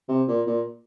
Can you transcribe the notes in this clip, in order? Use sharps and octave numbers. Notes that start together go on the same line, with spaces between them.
C3
A#2
A#2